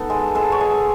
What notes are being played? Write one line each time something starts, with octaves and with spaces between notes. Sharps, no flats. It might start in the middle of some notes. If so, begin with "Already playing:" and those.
Already playing: B3 D#4 A4
G#3
G#3 A4
C#5
G#3